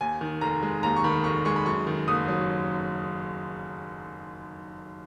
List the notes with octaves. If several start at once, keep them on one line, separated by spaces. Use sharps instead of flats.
D#2 G#5
D#3
F1 A#5
G#3
D#2 A#5
C#6
D#3 B5
F1 C#6
G#3 C#6
B5
F#2 C#6
D#3
F#1 D#6
F#3